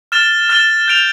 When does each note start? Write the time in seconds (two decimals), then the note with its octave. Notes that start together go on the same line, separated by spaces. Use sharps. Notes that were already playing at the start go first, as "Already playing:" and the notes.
0.12 F6 A6 E7 G7
0.49 F6 A6 E7 G7
0.88 G6 D7 F7